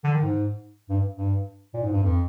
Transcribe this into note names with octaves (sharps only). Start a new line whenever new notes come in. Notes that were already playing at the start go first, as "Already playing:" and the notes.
D3
D#3
G#2
G2
G2
A#2
G#2
G2
F2